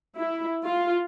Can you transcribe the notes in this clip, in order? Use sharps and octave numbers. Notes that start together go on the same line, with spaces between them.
E4
F4